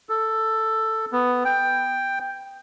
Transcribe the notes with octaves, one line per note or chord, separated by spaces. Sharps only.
A4
B3
G5